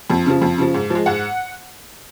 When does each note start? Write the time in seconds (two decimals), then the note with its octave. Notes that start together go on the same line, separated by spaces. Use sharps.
0.10 F2
0.26 C#3 F3
0.41 F2
0.58 C#3 F3
0.74 G#2
0.90 F3 G#3
1.06 G#2 F#5